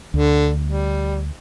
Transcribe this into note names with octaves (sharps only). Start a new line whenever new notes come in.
D2 D3
G3